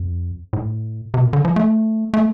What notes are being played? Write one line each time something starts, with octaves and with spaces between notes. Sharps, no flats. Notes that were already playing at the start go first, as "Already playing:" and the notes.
Already playing: F2
A2
C3
A#2
D3
F3
A3
A3